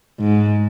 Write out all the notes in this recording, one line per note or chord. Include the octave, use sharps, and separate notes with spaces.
G#2